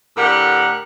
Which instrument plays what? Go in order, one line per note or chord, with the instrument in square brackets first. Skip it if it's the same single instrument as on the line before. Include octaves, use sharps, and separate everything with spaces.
[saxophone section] A2 D3 G4 A#4 F#5